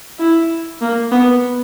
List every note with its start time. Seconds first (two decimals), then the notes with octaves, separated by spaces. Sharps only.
0.19 E4
0.81 A#3
1.12 B3